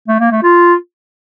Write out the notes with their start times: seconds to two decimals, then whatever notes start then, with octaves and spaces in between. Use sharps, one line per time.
0.08 A3
0.20 A#3
0.31 A3
0.43 F4